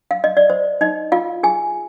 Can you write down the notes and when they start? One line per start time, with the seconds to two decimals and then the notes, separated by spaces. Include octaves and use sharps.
0.11 F5
0.24 D#5
0.37 D5
0.50 C5
0.81 D#4 D#5
1.12 F4 F5
1.43 G#4 G#5